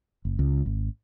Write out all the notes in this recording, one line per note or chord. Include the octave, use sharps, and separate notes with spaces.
F#1
C#2
G#1